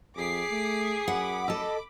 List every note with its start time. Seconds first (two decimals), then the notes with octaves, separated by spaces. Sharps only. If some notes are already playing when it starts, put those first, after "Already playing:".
0.17 F2 G#4 D6 B6 C7
0.51 A3
1.08 F#2 F#5 B5 D6
1.48 A4 D#5